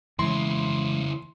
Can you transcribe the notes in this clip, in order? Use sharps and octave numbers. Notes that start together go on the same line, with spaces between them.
C#3 E3 G#3 E4 C6